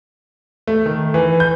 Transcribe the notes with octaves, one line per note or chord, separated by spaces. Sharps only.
A3
D#3
E3
G6